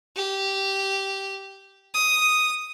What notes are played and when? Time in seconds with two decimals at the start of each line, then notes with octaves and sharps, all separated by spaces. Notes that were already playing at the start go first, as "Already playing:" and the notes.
0.16 G4
1.94 D#6